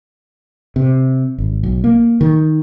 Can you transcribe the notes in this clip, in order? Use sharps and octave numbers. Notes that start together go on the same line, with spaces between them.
C3
G#1
B1
A#3
D#3